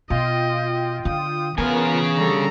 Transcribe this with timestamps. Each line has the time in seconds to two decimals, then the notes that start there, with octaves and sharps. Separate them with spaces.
0.10 B2 F4 D#5 G5
1.05 D3 D#6
1.58 C#3 E3 B3 F4 A#4 G#5
2.16 D3 G3 A4 A#5